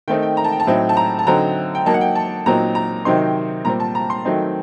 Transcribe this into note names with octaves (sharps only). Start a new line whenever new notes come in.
D#3 A3 C4 D#4 G5
G5
A#5
A5
G5
A5
A2 F#3 C4 D#4
A5
A#5
A5
D3 F#3 C4 D#4 A#5
G5
F#3 A#3 D#4 A5
F#5
G5
A5
A#2 F#3 C4 D#4 A#5
A#5
C3 D#3 F#3 C4 D#4 C6
A#2 G3 C4 A#5
A5
A#5
C6
D#3 F#3 A3 C4 D#4